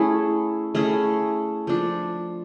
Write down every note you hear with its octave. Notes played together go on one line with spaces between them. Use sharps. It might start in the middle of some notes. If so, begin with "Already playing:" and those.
Already playing: A3 C#4 E4 G#4
A3 C#4 E4 G#4
F3 A3 D4